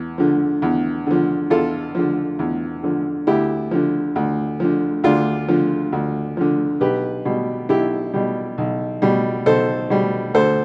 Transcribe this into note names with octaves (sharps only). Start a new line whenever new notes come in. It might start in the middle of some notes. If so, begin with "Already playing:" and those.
Already playing: E2
D3 F3
E2
D3 F3
E2 F4 A4
D3 F3
E2
D3 F3
D2 E4 G4
D3 F3
D2
D3 F3
D2 D4 F4
D3 F3
D2
D3 F3
B1 G4 B4
B2 G3
B1 E4 G4
B2 G3
B1
B2 G3
B1 A4 C5
B2 G3
D2 A4 C5